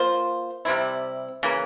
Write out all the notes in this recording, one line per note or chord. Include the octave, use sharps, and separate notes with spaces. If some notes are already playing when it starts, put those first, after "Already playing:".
Already playing: A#3 F4 C5
C3 G3 C4 E4
C#3 E3 A#3